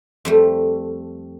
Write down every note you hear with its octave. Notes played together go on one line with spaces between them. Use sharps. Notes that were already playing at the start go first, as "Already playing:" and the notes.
F2 G3 A3